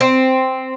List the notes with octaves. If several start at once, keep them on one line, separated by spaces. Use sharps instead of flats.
C4